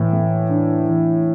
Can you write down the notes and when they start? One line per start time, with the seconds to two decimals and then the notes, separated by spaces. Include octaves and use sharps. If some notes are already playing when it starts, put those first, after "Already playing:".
Already playing: A2 E3
0.13 A3
0.50 D4
0.88 E3